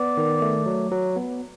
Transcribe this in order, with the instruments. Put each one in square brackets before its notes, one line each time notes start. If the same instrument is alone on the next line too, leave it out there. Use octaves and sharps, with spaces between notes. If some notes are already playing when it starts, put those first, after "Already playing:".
Already playing: [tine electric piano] B3 [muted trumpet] D5
[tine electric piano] D#3
A3
F#3
F#3
B3